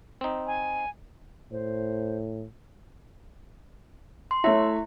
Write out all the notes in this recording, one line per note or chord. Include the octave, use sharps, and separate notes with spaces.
C4 D#4
G#5
A2 C5
C6
A3 E4 C#5 E5